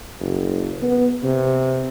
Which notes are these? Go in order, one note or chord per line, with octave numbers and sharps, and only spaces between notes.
F#1
B3
C3